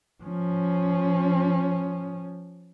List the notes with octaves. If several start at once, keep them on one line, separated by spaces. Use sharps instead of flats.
F3 C#4